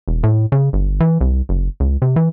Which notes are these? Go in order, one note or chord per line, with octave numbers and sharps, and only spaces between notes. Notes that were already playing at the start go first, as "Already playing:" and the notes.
E1
A2
C#3
G1
E3
C2
F#1
C#2
C3
E3